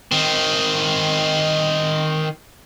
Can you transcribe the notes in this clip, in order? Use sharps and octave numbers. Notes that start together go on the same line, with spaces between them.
D#3 C4